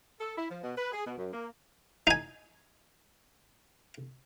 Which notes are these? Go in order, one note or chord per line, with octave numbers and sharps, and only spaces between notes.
A4
E4
F3
B2
B4
G#4
B2
F#2
A#3
D#4 G#5